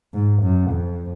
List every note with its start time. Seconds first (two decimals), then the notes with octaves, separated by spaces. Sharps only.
0.14 G#2
0.43 F#2
0.71 F2